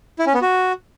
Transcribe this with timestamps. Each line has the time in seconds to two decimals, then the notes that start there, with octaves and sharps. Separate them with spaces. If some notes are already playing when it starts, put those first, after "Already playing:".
0.19 E4
0.27 C#4
0.34 B3
0.42 F#4